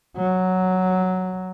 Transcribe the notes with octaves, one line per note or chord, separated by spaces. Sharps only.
F#3